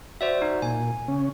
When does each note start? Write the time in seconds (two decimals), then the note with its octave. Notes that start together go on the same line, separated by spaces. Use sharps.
0.21 F#4 C5 D5 E5
0.42 D#4
0.62 A#2 G#5
1.08 C#3 C#4